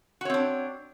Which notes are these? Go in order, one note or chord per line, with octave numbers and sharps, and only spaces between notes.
C4 D4 F#4 C#5